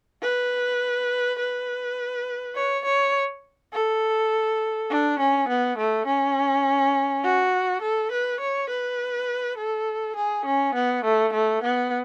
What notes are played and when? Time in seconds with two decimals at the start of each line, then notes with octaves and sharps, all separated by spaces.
0.22 B4
1.39 B4
2.56 C#5
2.85 C#5
3.73 A4
4.90 D4
5.19 C#4
5.49 B3
5.78 A3
6.07 C#4
7.24 F#4
7.82 A4
8.12 B4
8.40 C#5
8.70 B4
9.58 A4
10.16 G#4
10.46 C#4
10.75 B3
11.04 A3
11.34 A3
11.63 B3